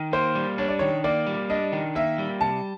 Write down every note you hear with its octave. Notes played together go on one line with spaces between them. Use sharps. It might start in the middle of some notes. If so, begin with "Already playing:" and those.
Already playing: D#3
A#3 C5
G3
D4 C#5
D5
D#3 C#5
A#3 D5
G3
D4 D#5
D#3
A#3 E5
G3
C3 A5